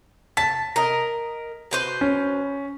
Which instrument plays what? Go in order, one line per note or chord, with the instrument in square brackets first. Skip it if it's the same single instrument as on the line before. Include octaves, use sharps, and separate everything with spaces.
[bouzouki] A5 [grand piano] B6
[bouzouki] A#4 D#5
B2 B4 C5
[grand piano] C#4